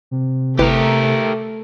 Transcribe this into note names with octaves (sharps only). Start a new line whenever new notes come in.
C3
G1 A3 E4 G4 A#4 B4